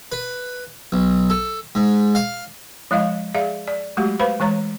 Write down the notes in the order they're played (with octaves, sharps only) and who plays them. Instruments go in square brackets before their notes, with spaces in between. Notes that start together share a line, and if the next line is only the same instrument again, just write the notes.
[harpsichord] B4
B1
A4
G#2
F5
[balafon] F3 G#3 E4 D#5 F5
G#4 D5 E5 F5
D5
F#3 G#3 A3 F#4 G4
B4 C5 F5 B5
E3 G#3 C#5 A#5